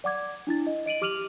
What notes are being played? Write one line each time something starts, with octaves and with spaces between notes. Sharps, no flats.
D5 F#5 D6 G#6
D4 E4 A6
D#5
D#5 D7 D#7 F#7
G4 D6 F6 D#7 F7 F#7